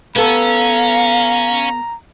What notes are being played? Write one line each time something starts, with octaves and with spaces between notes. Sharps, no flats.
B3 C#4 A4 F5 A#5